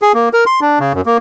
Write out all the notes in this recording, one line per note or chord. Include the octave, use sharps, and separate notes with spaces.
G#4
A#3
A#4
C6
D4
C#3
F#2
A#3